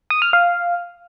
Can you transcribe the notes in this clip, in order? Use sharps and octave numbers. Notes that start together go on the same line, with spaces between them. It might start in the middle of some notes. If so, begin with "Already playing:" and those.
D#6
F6
F5